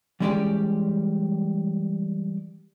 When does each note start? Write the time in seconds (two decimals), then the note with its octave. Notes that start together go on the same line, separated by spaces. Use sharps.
0.20 E3 G3 G#3 C#4 G4 D5